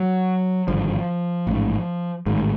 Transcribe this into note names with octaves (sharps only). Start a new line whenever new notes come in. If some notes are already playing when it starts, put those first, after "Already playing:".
Already playing: F#3
G#1 G2 D3 F3
A1 G#2
A1 G#2 D#3